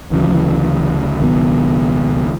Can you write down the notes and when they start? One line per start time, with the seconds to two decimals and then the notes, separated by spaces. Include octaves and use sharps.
0.11 D2 C#3 E3 F#3
0.23 F3
0.33 E3
1.20 C#2 B2 D#3 F#3 B3